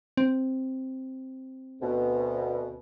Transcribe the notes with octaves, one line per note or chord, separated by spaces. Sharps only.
C4
D2 B2